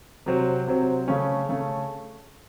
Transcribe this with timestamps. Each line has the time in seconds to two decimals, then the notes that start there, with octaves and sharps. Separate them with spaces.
0.26 C3 F#3 C4
0.67 C3 F#3 C4
1.08 C#3 A3 C#4
1.49 C#3 A3 C#4